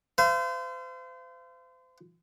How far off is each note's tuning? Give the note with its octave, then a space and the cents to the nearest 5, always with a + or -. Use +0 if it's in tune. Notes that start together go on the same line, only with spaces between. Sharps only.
C5 -35 F5 -40